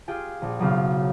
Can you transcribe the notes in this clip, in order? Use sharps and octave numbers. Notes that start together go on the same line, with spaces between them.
F4 G4 G#4 G5
A#1
F#1 B1 C#3 F5